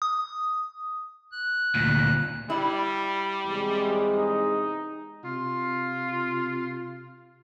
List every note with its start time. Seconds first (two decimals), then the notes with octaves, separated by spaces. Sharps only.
0.02 D#6
1.32 F#6
1.75 D2 A#2
2.50 G3 E4
3.46 E2 C3 G#3
4.17 D#4
5.24 C3 F4